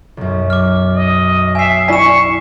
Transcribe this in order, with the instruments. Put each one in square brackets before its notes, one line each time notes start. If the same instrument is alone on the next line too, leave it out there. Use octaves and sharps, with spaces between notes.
[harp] B1 F#2
[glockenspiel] D6 F6
[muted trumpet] D#5
[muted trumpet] E5 [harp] G5 [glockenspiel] G#5 C7
[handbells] E4 D5 G#5 [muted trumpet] C#6 [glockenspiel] B6 E7